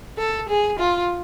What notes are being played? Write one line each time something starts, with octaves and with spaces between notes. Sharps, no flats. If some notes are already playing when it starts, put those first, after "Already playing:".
A4
G#4
F4